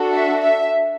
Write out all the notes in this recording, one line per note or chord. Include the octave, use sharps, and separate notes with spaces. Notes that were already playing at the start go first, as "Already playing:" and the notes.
Already playing: D4 F#4 A4
E5
E5